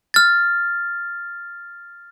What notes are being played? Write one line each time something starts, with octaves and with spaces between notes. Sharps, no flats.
F6 A6